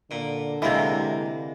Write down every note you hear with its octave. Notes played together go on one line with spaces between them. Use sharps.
A#2 D3
C3 E3 G#3 A#3